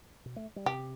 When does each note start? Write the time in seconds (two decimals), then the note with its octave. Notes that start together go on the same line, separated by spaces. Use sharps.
0.26 B2
0.36 A3
0.56 G3
0.66 C3 G4